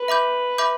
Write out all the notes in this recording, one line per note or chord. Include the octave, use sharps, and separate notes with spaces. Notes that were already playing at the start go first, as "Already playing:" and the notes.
Already playing: B4
E5 B5 D6 G6
E5 B5 D6 G6